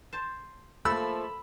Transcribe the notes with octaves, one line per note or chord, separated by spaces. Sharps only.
C5 A5
F3 A3 A#3 A4 B5 E6